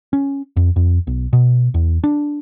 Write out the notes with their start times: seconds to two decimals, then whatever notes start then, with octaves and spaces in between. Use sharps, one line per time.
0.13 C#4
0.57 F2
0.76 F2
1.07 B1
1.33 B2
1.74 E2
2.04 D4